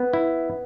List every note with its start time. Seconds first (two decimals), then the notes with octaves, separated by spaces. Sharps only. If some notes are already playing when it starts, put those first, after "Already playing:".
Already playing: B3
0.13 E4